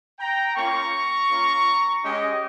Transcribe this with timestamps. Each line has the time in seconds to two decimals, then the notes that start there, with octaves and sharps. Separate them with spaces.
0.19 G5 A#5
0.56 A#3 C#4 F4 A#5 C#6
1.30 A#3 C#4 F4
2.04 G#3 C#4 G4 D#5 G5